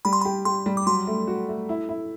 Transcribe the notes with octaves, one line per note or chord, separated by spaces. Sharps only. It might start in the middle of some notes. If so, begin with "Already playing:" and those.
G3 B5
C6
B5
G4
G4 C6
G3
D6
F#3 C6
A3
F#4
A3
E4
E4